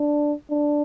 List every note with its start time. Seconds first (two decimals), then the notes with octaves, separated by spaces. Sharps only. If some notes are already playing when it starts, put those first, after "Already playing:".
Already playing: D4
0.51 D4